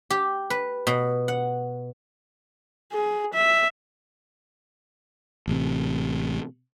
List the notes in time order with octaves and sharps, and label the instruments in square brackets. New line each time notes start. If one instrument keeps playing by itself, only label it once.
[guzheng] G4
B4
B2
F#5
[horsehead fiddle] G#4
E5
[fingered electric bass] A1 C3